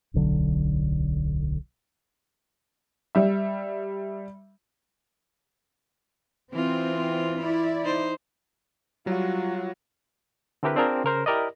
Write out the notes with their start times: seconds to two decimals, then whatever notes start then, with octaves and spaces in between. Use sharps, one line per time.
0.14 D1 B1 D3 F#3
3.15 G3 E5
6.53 E3 C4 F4
7.39 E4 D5
7.83 D#4 C5
9.06 F#3 G3 F4 F#4
10.63 D3 C4 E4 G4 A#4 B4
10.76 C4 D4 F4 G#4 A#4
11.04 C#3 A#4 C5
11.26 E4 G4 A#4 D5 D#5